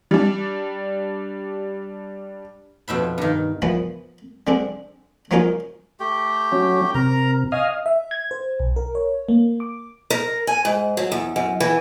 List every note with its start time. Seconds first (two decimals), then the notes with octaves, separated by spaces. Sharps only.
0.11 G3 D4
2.88 F2 B2 E5 B5
3.18 G2 D#3
3.62 A#2 E3 F3 B3
4.47 D3 G#3 C4 D4
5.31 F3 F#3 A#3 C#4 D#4 F4
6.00 A3 G4
6.52 F#3 C#4
6.95 C3 A#4 A#5
7.52 C#4 D#5 F5 G#5
7.86 E5
8.11 G#6
8.31 C5
8.60 B1
8.76 A#4
8.95 C#5
9.29 A#3
9.60 D6
10.10 A#4
10.47 G#5
10.65 G#2
10.97 F#3
11.12 E2
11.36 F#2
11.60 E3